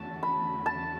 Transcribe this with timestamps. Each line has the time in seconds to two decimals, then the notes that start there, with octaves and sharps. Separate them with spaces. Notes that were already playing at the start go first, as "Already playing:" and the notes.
Already playing: E2 D3 A3 C#4 F#4 A5
0.23 B5
0.66 A5